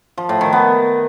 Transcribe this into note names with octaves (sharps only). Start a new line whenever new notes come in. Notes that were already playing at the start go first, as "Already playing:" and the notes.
F3
A2
D#3
B3